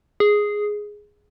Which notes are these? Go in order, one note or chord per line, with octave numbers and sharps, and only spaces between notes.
G#4